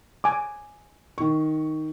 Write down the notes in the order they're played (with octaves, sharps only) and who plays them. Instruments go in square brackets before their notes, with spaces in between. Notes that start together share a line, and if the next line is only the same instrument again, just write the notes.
[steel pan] G#5 D6
[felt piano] D#3 C#6